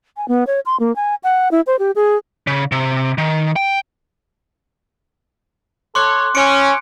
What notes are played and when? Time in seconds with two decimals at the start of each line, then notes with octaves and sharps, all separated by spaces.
0.17 G#5
0.28 B3
0.47 C#5
0.66 C6
0.80 A#3
0.96 G#5
1.23 F#5
1.51 E4
1.67 C5
1.79 G4
1.95 G#4
2.47 C#3
2.72 C3
3.18 D#3
3.56 G5
5.95 A4 C#5 C6 D6 F#6
6.35 C#4 C#7 D7